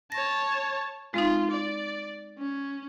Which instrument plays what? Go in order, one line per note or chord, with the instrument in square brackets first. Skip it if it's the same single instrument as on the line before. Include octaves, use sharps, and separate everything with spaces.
[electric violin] C#5 A5 [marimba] A#6
[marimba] G#3 C4 D#4 [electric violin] F4
[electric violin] D5
C#4